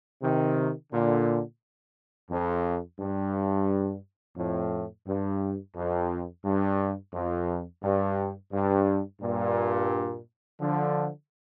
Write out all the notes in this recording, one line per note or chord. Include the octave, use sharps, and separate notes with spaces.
C3 D#3
A#2 D3
F2
G2
F2 A2
G2
F2
G2
F2
G2
G2
G2 A#2
D3 F3